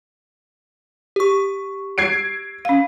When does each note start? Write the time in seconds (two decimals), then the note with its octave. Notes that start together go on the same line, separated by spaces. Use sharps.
1.16 G4 C#6
1.98 G#6 C7 D7
2.65 C#4 F5